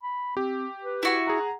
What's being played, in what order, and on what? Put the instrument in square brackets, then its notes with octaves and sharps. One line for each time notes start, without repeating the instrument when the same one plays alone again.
[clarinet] B5
[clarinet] C4 [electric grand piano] G4
[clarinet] B4
[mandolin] E4 F#4 C#6
[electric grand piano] G#4 F#5 [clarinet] A#5